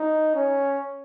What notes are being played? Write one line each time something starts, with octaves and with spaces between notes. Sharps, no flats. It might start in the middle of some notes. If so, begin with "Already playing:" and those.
Already playing: D#4
C#4